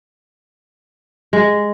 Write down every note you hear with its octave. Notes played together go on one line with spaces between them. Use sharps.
G#3